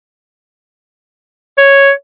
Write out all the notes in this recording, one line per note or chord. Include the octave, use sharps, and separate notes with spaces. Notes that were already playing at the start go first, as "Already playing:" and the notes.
C#5